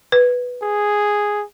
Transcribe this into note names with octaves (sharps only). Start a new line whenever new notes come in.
B4
G#4